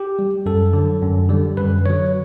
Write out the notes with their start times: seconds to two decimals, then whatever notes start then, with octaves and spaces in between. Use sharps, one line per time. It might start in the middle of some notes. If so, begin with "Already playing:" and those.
Already playing: G4
0.19 G3
0.46 F#2 A4
0.73 D3 F#3
1.02 F#2
1.29 D3 G3
1.57 F#2 B4
1.85 D3 F#3 C#5